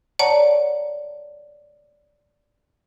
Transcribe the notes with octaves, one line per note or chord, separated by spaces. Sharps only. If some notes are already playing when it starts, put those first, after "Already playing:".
C#5 D5 F#5 A5 A#5